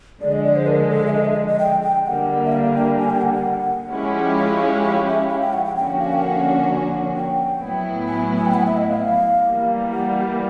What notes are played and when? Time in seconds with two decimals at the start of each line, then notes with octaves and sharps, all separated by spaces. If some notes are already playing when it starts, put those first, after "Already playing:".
0.21 D3 F3 G#3 D5
0.32 D#5
0.44 D5
0.56 C5
0.67 A#4
0.90 A4
1.07 E5
1.13 D#5
1.25 E5
1.36 D#5
1.48 D#5
1.60 G5
1.83 G5
2.05 D3 G3 A#3 F#5
2.45 E5
2.52 F5
2.75 G5
2.98 G#5
3.10 G5
3.21 F#5
3.33 F#5
3.91 F3 G#3 C#4 E4 G4
4.38 F5
4.84 F5
5.08 E5
5.30 F5
5.42 G5
5.53 F#5
5.65 G5
5.76 D3 F3 A#3 C#4 F#4 G5
6.00 F5
6.13 G5
6.23 F#5
7.16 G5
7.62 A2 F#3 B3 E4
8.08 G#5
8.37 G#5
8.46 G5
8.54 F#5
8.66 E5
8.77 D#5
8.89 F5
9.46 E3 G3 A#3
9.93 F#5